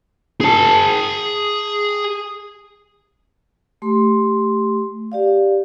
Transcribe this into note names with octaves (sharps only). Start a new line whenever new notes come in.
G#4 A5
A3 G4 C6
G4 D5 F5